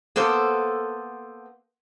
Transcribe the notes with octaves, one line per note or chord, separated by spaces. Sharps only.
A#3 B3 A4 C5